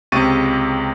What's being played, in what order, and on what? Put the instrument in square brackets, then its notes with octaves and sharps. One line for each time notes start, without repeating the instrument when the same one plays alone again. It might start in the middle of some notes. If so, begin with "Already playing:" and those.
[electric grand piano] C#2 C3 C#6 A6 D#7